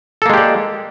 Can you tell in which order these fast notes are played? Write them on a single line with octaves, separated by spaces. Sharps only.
A4 A#3 G#3 G4 D5